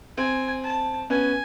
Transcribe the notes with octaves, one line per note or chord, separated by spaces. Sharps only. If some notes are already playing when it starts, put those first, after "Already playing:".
C4 G#5
A5
B3 C#4 G#5